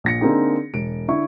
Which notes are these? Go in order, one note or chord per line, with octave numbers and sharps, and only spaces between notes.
A#1 A#6 C#7
D3 A#3 C4 D#4 G#4
E1 D7
D3 E4 C#6